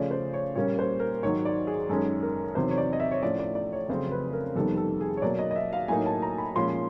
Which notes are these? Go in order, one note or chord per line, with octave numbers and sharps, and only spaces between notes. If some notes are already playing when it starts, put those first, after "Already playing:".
Already playing: C#3 F3 A3 C#4 D5
C5
C#5
A#2 G3 A#3 C#4 C#5
C5
A#4
G#2 D#3 F#3 C#5
D5
G#4
F#2 D#3 G#3 C#4 A4
A#4
E2 C3 D#3 F#3 C5
C#5
D5
D#5
E5
C#5
A2 F3 A3 C#4 D5
D5
D5
C#5
F2 C#3 F#3 A3 C4 C5
B4
A#4
F2 C3 D#3 G3 B3 A4
A4
G#4
C#5
B2 F#3 A#3 D5
D#5
D#5
E5
F5
A2 F#3 A#3 D#4 G#5
A5
A#5
B5
A#2 F3 G#3 C#4 C6